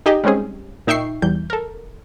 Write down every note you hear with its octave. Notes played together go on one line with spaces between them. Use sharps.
D#4 G4 G#4 D#5
G3 G#3 C4 C#4 G#4
A#2 D#4 E5 G5 C#6 C7
E2 G3 G6
A4 A#4